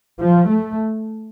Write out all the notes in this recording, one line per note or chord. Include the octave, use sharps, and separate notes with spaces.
F3
A3